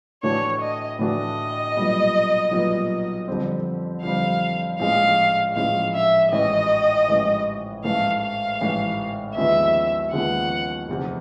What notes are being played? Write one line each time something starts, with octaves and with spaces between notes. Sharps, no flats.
A2 E3 A3 D4 F#4 C#5
D#5
A2 E3 A3 D4 F#4 D#5
B1 A#2 G3 B3
B1 A#2 G3 B3
F2 D3 G3 C4
F2 D3 G3 C4 F5
A#1 A2 E3 G#3 C#4 F5
A#1 A2 E3 G#3 C#4 F5
E5
A1 G#2 E3 D#5
A1 G#2 E3
A1 G#2 E3 A3 F5
F5
A1 G#2 E3 A3
D#2 C#3 F3 G#3 B3 E5
D#2 C#3 F3 G#3 B3 F#5
F1 E2 C3